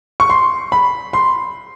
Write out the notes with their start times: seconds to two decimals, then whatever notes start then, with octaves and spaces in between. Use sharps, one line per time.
0.20 C#6
0.30 C6
0.72 B5
1.13 C6